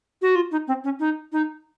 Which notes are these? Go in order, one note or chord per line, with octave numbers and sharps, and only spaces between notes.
F#4
F4
D#4
C4
C#4
D#4
D#4